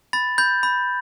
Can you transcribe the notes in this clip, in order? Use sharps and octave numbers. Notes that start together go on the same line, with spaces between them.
B5 A6
B5 G6
B5